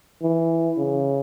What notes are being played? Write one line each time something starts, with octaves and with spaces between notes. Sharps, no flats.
E3
C#3